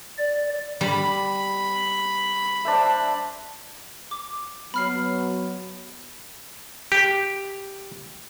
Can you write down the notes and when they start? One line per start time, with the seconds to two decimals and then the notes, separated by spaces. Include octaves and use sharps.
0.18 D5
0.81 G3 B5
2.65 D4 C5 E5
4.11 D6
4.74 F#3 B3 B5 F6 C7
6.92 G4